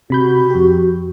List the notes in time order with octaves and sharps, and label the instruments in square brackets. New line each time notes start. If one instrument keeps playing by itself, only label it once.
[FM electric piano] C3 B5 G6 [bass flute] F#4
[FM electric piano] F2 G4